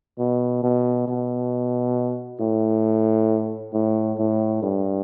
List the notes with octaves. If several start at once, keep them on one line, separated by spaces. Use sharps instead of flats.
B2
B2
B2
A2
A2
A2
G2